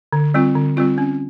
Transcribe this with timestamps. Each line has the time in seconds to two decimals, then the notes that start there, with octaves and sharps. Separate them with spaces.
0.13 D3
0.34 G3 C4 F4
0.55 D3
0.77 G3 C4 F4
0.98 C#4